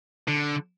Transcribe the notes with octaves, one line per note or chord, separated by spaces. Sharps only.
D3